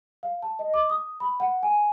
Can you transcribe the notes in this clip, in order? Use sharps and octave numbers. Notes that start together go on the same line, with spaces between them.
F5
A5
D#5
D6
D#6
B5
F#5
G#5